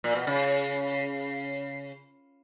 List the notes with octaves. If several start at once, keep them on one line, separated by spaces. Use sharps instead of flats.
A#2
B2
C#3